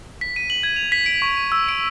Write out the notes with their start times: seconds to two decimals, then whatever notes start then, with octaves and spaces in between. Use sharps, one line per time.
0.21 B6
0.36 D#7
0.50 F#7
0.63 G#6
0.76 F7
0.92 B6
1.06 D7
1.22 C#6
1.37 D#7
1.52 E6
1.68 D7